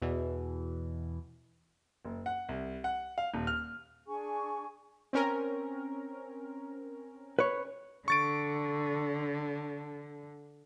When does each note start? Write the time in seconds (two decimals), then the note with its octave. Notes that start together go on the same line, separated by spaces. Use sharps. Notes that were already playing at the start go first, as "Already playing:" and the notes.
0.02 E2 B2 E3
2.05 F#1
2.26 F#5
2.49 C2
2.84 F#5
3.18 F5
3.34 D#1
3.47 F6
4.07 D4 G#4 G#5 C#6
5.13 C4 C#4 A#4
7.39 B4 C#5
8.08 D3 C#6 A6 D7